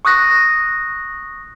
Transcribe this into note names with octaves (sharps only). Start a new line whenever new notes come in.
C#6 D#6 F#6 A#6